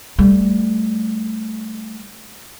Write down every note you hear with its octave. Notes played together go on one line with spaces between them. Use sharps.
G3 A3